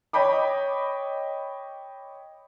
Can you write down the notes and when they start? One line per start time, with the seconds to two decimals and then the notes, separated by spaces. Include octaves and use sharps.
0.13 C#5 D#5 G5 B5 D6